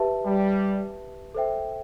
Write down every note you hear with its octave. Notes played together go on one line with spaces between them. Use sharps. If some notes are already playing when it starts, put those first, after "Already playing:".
Already playing: G4 B4 E5 A5
G3
A4 C5 E5 G5